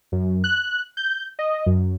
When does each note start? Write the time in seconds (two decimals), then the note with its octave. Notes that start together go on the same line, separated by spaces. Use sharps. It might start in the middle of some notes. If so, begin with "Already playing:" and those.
0.12 F#2
0.44 F#6
0.97 G6
1.39 D#5
1.66 F#2